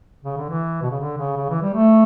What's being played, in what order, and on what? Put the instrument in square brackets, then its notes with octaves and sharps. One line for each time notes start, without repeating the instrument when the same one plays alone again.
[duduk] C#3
D3
E3
B2
C#3
D3
C#3
C#3
E3
G3
A3